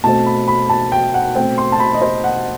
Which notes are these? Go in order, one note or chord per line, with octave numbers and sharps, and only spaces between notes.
B2 A3 C4 A5
B5
B5
A5
G5
F#5
B2 A3 C4 G5
C6
A5
B5
D#5
C5
F#5